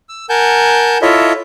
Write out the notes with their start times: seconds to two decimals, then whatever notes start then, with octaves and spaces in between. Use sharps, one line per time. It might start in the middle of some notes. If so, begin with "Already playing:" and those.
0.09 E6
0.29 A#4 F#5 G#5 A5 G6
1.02 E4 F4 A4 C#5 D#5 E5